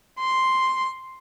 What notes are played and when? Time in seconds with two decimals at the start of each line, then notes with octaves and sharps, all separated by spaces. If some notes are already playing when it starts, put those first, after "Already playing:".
0.19 C6